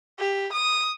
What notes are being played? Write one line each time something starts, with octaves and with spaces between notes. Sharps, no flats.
G4
D#6